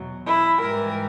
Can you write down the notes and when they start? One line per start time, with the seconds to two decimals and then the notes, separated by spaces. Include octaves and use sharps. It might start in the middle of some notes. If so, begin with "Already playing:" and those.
Already playing: E2 B2 F#3
0.26 E4
0.61 G#2 E3 G3 A#4